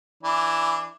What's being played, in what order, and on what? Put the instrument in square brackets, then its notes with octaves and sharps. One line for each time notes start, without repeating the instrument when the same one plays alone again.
[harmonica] E3 D4